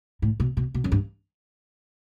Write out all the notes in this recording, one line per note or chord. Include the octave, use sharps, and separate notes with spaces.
A2
B2
B2
B2
F#2
G2